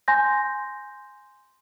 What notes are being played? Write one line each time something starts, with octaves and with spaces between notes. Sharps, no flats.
G#5 C6 G6 A#6